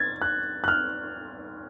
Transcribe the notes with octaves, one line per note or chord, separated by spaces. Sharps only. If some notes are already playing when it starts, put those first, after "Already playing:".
Already playing: G#6 A6
F#6
F#6
F6